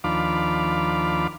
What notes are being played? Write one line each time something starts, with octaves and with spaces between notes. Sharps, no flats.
D#2 F3 D4 F5 B5 D6